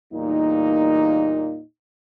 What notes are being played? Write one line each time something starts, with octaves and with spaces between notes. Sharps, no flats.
E2 A#2 G3 A#3 D#4